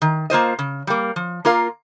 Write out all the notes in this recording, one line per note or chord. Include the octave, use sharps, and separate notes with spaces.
D#3
A#3 F4 C5 D#5
C#3
G3 A#3
F3
A#3 F4 A#4 F5